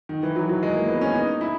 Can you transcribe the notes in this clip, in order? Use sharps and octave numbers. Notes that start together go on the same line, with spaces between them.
D#3
E3
F#3
F#3
G#3
A#3
B3
C#4
D#4
E4